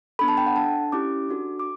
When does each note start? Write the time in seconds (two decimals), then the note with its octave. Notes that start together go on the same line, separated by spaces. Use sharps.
0.19 B3 D4 A4 B5
0.28 A5
0.37 G5
0.47 F#5
0.56 D4 A4 A5
0.92 C#4 E4 G4 D6
1.29 D4 F#4 A4
1.59 D6